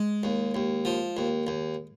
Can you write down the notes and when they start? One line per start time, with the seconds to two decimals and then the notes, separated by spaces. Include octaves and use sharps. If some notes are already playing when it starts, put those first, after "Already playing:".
Already playing: G#3
0.23 D#2
0.55 D#2
0.85 F3
1.17 D#2
1.47 D#2